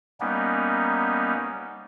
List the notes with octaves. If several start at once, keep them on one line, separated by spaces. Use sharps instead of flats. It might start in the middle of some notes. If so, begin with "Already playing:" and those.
G3 A#3 B3 C#4 D#4